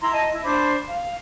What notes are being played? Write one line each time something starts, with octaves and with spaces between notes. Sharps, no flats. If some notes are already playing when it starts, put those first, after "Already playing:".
E4 A#5 C6
D#5 A5
E4
D4 C5 B5 D6
F5